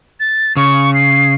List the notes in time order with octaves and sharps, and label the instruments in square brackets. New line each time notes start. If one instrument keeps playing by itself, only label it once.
[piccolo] A6
[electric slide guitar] C#3 [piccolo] C#6
[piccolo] C7